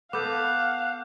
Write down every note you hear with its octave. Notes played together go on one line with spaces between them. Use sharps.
B3 A4 B4 F5 F#5 D6 G6